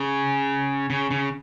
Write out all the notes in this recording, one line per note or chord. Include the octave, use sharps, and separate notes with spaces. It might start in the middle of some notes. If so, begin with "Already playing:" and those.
Already playing: C#3
C#3
C#3